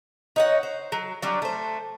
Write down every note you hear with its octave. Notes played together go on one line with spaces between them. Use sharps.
D#4 C#5 F#5
C5
F#3
F#3 G3 D4
A3 C5